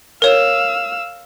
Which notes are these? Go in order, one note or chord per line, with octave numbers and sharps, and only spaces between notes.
A#4 C#5 F5 E6